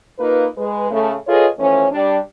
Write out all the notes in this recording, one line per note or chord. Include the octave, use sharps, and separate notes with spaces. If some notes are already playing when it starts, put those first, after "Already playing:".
A#3 D#4 F4 B4
G#3 G#4 B4
C#3 A3
F4 G#4 A4 B4 C#5 D#5
E3 F3 A3 C#4
G3 D4